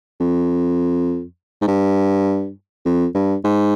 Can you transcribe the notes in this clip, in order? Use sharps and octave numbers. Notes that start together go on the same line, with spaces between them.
F2
G#2
G2
F2
G2
G#2